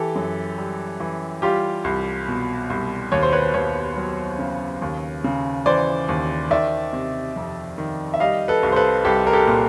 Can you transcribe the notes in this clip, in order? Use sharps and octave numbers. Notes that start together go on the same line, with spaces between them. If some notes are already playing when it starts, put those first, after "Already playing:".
Already playing: E3 G4 A4
F#2
G3
E3
G3 F4 G4
C2
B2
C2
D#2 C#5
C5
B4 C#5
D#2 B4 C#5
F#3
C#3
D#2
C#3
E3 C5 D5
D#2
D#3 D5 E5
C3
F2
D#3
E5
G3 D#5 F5
A4 B4
C2
C5
A4 B4
C2 G4 A4
A#4
G4 A4
A#2